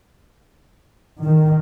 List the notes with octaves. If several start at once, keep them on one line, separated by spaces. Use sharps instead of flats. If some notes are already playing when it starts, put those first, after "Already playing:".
D#3